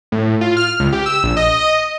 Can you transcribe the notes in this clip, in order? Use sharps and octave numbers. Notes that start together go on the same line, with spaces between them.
A2
F4
F6
C#2
G4
E6
A#1
D#5